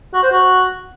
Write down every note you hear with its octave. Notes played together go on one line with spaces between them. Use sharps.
F#4
C5
F#4